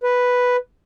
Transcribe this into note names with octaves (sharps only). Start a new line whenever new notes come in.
B4